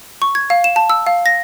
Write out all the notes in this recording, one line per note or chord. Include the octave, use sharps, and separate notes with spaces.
C#6
G#6
F5
E7
A5
E6
F5
A#6